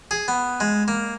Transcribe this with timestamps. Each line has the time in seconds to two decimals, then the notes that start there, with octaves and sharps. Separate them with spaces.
0.11 G#4
0.28 B3
0.60 G#3
0.88 A#3